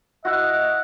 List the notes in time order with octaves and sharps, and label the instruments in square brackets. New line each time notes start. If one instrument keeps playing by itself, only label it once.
[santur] E4 F#4 [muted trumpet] D#5 [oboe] F#5